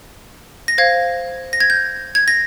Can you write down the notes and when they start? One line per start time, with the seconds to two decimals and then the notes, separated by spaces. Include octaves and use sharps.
0.68 A#6
0.78 C5 F5 G#6
1.53 A#6
1.60 G#6
1.70 G6
2.15 G#6
2.28 A#6